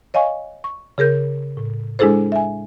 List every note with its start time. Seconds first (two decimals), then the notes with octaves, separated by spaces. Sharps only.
0.14 C#5 D#5 F5 G#5 C#6
0.64 C#6
0.98 C#3 G#4 A#4 G6
1.57 A2
1.99 G#3 D4 E4 G#4 A4 C5
2.32 E5 G#5